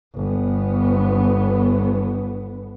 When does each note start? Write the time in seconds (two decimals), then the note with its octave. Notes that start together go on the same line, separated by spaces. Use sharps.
0.15 G1 B3